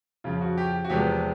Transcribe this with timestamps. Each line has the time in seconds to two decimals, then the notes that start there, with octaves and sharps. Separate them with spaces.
0.24 F2 C#3 F3 F4
0.41 F#4
0.58 G4
0.84 F#4
0.90 E2 C3 F3 G#3 B3 G4